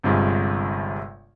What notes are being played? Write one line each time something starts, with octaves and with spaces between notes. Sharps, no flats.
G1 G2 C3 G#3 F4